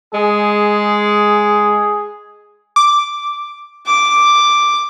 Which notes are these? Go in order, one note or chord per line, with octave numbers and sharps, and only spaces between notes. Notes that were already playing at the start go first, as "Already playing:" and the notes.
G#3 G#4
D6
D6